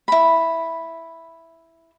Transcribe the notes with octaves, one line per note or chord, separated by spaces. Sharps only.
E4 B5